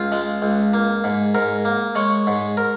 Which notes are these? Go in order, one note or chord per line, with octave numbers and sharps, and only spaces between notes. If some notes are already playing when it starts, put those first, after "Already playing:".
Already playing: C#2 F4
G#3
C#2
A#3
G#2
G#2 A#4
A#3
G#3 C#5
G#2
A#4